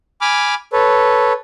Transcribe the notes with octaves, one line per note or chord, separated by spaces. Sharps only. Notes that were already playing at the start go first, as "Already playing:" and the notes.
G#5 B5 D6 F6
A4 B4 C#5